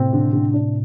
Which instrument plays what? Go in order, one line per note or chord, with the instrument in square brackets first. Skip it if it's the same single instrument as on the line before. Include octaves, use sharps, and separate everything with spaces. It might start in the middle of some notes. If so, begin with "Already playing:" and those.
Already playing: [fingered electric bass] A2 C3 [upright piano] C4
[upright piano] D3
D3
D4